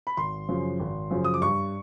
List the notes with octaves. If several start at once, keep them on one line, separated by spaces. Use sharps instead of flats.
B5
G#1 C6
F#2 C#3 F3
G#1
F#2 C#3 F3
D#6
D6
G2 C#6